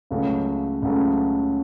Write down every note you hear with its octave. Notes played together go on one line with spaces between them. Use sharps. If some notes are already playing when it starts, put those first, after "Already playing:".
C#2 C#3 F#3 A3 C#4
C#2 C#3 F#3 A3 C#4